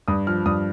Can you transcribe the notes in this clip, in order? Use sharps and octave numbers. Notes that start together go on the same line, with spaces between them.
G2 D#6
F3 F6
G2 D#6